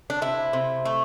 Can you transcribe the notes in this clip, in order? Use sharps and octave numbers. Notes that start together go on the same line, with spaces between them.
D4
C3 E4
C3
A3